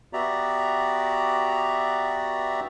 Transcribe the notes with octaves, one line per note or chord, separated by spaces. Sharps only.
B3 F#4 G4 D5 E5 A#5